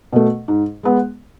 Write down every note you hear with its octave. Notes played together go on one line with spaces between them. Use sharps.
B2 A3
G#2
G#3 B3